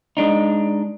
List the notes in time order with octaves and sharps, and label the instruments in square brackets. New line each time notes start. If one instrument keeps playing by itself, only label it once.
[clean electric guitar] G#3 D4 D#4